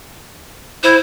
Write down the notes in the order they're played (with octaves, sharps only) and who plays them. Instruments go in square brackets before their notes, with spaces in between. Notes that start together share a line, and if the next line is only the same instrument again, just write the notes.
[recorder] E4 [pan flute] C5